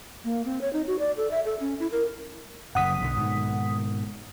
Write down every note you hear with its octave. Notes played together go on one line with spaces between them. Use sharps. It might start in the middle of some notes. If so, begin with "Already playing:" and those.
A#3
C4
C#5
D#4
F#4
D5
A4
E5
A4
C#4
E4
A#4
F#1 F#2 F#5 D#6 B6
B1 D3
G#2 B2 D#3